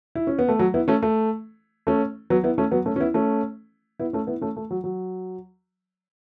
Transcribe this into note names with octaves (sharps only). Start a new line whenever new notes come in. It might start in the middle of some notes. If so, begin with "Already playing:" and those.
E4
C#4
B3
A3
F#3
B3 E4
A3 C#4
A3
A3 C#4
F#3 B3
B3 E4
A3 C#4
F#3 B3
A3 C#4
C#4
B3 E4
A3 C#4
B3 E4
A3 C#4
B3 E4
A3 C#4
A3
F#3
F#3